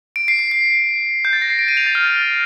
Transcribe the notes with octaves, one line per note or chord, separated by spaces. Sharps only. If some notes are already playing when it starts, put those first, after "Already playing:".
D7
C7
C7
C7
G6
A6
A#6
C7
D7
D#7
F7
A6
F6